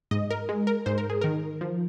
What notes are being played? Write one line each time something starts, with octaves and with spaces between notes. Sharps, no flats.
G#2 D#5
A#4
G#3
A#4
G#2 C5
A#4
G#4
D#3 A#4
F3